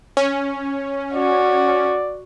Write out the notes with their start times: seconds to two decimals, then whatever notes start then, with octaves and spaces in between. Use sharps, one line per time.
0.17 C#4
1.14 F#4 D5